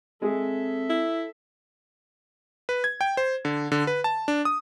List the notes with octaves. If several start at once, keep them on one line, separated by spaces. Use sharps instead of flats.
G#3 C4 G#4 A4 E5
E4
B4
G#6
G5
C5
D3
D3
B4
A5
D4
D#6